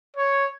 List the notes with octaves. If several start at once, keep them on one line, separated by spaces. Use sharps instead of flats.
C#5